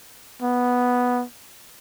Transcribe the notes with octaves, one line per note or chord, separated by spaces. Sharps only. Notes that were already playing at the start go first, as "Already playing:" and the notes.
B3